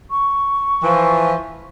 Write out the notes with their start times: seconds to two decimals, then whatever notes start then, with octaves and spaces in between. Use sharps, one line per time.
0.11 C#6
0.83 E3 F3